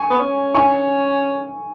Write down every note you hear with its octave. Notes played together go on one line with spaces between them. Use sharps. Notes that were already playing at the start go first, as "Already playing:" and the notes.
Already playing: G#5 C#6
B3
C#4
G#5 C#6